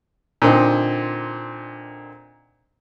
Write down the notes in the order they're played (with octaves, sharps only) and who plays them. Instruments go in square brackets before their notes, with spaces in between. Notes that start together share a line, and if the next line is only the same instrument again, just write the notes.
[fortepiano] A#2 D3 C4 D#4